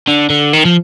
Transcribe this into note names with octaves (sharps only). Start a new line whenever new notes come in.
D3
D3
D#3
F3